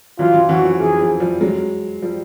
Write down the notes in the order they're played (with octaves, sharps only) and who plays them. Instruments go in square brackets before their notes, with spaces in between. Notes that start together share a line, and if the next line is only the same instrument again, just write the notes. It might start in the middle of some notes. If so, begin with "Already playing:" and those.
[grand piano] E3 F#3 [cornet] F4
[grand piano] E3
[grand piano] E3 F#3 [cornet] F#4
[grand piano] F3
[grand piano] E3 [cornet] G#4
[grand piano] F3
F3 G3
F#3 G#3
F3 G3